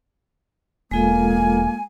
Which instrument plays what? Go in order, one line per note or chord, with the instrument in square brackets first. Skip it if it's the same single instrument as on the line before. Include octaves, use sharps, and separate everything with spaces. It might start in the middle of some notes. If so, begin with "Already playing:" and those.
[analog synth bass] E1 [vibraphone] G#3 F4 A4 [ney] A#3 [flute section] G#5